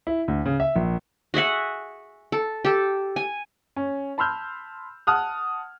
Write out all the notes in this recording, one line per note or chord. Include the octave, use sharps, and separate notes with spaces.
E4
D2
C#3
E5
A#1
F#4 G#4 E5 F#5
A4
G4 A4
G#5
C#4
A5 B5 C6 E6 F6 G6
F#5 A5 D#6 F6 F#6